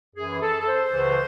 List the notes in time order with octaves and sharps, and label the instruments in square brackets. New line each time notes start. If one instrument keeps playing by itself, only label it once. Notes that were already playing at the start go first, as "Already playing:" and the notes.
[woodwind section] F#2 E3 G#4
A4
A4
C5
C#2 C#3 E3